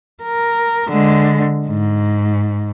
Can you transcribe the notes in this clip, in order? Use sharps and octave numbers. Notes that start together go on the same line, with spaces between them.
A#4
D3 G#3
G#2